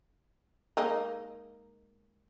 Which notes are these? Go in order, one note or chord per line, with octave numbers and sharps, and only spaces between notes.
G#3 A#3 D#4